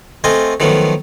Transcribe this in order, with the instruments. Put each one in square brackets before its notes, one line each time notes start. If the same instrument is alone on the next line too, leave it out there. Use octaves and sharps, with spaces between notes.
[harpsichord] A3 C4 F4 D#5 G#5
D#3 F3 F#3 A3 B3